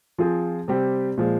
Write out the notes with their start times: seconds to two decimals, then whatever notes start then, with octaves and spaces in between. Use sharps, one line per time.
0.18 F3 C4 F4 G#4
0.68 C3 G3 C4 G4
1.17 A#2 F3 G#3